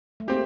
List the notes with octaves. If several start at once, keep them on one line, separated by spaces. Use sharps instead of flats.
A3
A#3 C4 G4